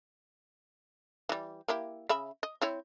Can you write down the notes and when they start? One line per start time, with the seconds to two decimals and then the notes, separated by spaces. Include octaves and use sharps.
1.29 E3 G3
1.68 A#3 E4 G4
2.09 C#3 E5 B5
2.43 D#5
2.62 C4 E4 C#5